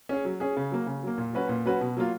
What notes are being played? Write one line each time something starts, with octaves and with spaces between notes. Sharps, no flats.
C#4 G#4
F#3
C#4 G#4
C#3
F#3 A#3
C#3
F#3 A#3
A#2
F#3 C#4 F#4 B4
A#2
F#3 C#4 F#4 B4
B2
F#3 A#3 F4